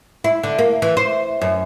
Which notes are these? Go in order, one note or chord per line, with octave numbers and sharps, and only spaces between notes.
E4
D3
A#3
E3
C5
F#2